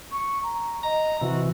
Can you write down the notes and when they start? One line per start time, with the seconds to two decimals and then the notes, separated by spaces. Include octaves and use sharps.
0.11 C#6
0.43 A#5
0.83 D#5 A#5
1.21 C3 E3 F#4